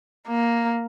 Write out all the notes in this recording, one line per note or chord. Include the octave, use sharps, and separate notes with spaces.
A#3